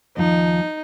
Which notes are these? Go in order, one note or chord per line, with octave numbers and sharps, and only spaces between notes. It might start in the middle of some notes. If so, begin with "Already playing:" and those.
D#2 F3 D#4